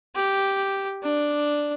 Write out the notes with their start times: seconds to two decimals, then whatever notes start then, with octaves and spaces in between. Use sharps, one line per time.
0.15 G4
1.03 D4